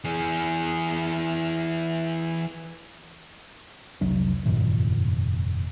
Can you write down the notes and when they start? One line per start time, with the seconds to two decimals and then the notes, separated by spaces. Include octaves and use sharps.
0.04 E3 G#4
4.01 F1 C2 F#3 D4
4.46 F1 G2 A#2 D#3